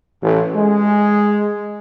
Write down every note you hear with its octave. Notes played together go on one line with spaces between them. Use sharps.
A1
G#3